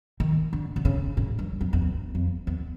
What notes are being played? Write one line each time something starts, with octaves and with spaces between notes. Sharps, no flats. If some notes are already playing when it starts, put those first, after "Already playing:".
D#3
D3
D3
C#3
A2
G2
F#2
F2
E2
F2
E2